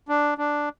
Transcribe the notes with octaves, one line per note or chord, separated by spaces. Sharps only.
D4
D4